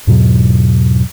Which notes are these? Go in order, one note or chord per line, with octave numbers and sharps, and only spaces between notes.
E2 G#2 B2 F#3